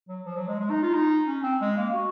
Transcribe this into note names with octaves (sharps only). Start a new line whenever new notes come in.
F#3
F3
F#3
G#3
G#3
D#4
F4
D#4
C#4
C4
G#3
A#3
F#4